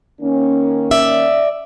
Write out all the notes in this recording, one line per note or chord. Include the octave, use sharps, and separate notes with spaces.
D#3 A#3 C#4
D5 E5